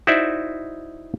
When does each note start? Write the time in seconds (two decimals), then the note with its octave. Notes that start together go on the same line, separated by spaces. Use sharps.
0.07 D#4 E4 F#4 C5 D5 E5